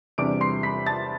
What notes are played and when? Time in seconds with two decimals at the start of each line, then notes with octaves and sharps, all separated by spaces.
0.18 E2 C3 G3 D4 D6 D7
0.41 C6 C7
0.63 B5 B6
0.86 A5 A6